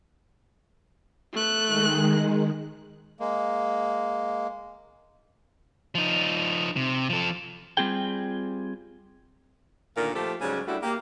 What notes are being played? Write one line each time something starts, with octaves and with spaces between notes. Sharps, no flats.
A3 F#6
D#3 G#3
G#3 A#3
F3 D#4
C3
F3 A4
G3 C4 F4 G#4 G5
D2 A#2 D3 D#3 A#4 F5
F3 A3 A#3 G4 A4 C5
G#2 C#3 F#3 G3 C#4
G3 A3 D4 E4 F#4
A#3 G4